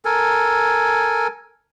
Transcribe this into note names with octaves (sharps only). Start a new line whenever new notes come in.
A4 A#4 G#5